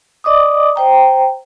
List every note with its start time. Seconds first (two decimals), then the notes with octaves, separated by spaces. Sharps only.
0.24 D5 D#5 D6 D#6
0.76 C5 G5 A#5